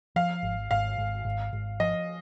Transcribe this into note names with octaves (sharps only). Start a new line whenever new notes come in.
F3 F5
G#1
G#1 F5
G#1
G#1
G#1
F3 D#5